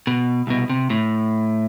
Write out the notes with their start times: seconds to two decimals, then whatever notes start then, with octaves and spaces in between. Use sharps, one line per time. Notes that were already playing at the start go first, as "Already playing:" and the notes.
0.07 B2
0.47 C2 B2
0.70 C3
0.90 A2